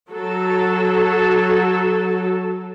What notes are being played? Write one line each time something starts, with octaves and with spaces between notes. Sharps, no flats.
F#3 A4